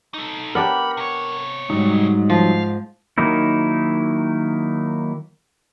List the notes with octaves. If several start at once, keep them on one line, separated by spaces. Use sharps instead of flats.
D#4 A4
B3 D4 G4 A#4 F#5 A#5 B5
C3 C#5
G#2 F#3 G3 D#4
F3 F5
D#3 F#3 A#3 D#4 E4